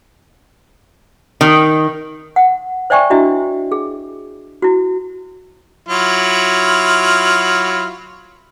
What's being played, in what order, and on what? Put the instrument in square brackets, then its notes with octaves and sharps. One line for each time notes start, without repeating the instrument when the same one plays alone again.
[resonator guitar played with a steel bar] D#3
[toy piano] F#5
C5 D5 E5 G5 G#5 C#6
D4 E4 F#4 D#5 E5
G#4
E4 F#4
[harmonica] F#3 E4 F4